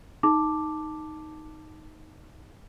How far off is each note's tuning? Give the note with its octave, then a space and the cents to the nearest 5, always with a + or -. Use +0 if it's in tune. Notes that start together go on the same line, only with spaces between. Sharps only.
D#4 +0 A5 +0 D6 +0